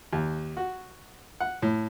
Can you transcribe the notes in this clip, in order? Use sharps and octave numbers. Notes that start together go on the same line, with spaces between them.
D#2
F#4
F#5
A2